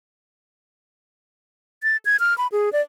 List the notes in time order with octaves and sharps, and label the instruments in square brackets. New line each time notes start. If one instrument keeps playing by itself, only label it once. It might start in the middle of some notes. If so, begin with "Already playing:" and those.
[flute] A6
G#6
F6
B5
G#4
D5